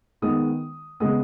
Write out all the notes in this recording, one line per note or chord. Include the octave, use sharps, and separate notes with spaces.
D#3 G#3 B3 D#6
C#3 G#3 B3 D#6